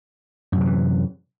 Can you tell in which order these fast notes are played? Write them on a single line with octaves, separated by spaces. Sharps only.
F#2 C3 D#3 E3